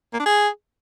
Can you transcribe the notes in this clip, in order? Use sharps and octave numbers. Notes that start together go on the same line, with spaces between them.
A#3
D4
G#4